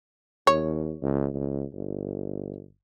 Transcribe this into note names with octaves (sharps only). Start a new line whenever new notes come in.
D#2 C#5
C#2
C#2
G1